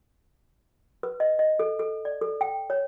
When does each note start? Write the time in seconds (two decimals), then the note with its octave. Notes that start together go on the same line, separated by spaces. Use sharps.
1.03 B4
1.20 D#5
1.39 D#5
1.60 A4
1.79 A4
2.05 D5
2.21 A4
2.41 G5
2.70 C#5